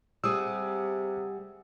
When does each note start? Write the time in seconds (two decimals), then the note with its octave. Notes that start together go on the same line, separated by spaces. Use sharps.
0.24 C3 G3 G#4 F#5 D#6 E6